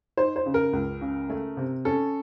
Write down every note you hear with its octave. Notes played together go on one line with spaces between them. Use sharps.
D#4 C5
C5
C#3
A#4
C#2
C#3
A3
C3
C#4 A4